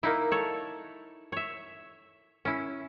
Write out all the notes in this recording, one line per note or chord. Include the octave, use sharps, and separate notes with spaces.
A#3 D#4 E4
A4 C#5
C#5 E5
C#4 E4